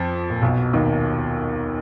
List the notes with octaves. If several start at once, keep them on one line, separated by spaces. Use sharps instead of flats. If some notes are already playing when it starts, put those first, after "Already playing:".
Already playing: F2 F3
A#2
B1 B2
D#2 D#3